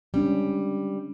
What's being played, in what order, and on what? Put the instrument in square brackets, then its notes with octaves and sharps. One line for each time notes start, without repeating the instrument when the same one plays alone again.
[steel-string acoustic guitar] G3 [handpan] G#3 C#4 D4